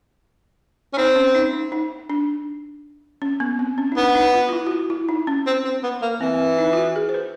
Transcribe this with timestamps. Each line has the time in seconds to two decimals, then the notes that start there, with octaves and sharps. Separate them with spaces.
0.93 C#4
0.97 C4 D#4
1.16 C#4
1.35 D#4
1.53 D#4
1.72 D#4
2.10 D4
3.22 C#4
3.40 B3
3.59 C4
3.78 C#4
3.92 D#4
3.96 B3 D4
4.15 D#4
4.34 F4
4.49 F4
4.52 E4
4.67 F#4
4.71 F4
4.90 E4
5.09 D#4
5.27 C#4
5.46 C4
5.65 C4
5.83 B3
6.02 A#3
6.21 E3 C4
6.59 D#4
6.73 F4
6.77 F#4
6.96 G#4
7.09 C5
7.14 B4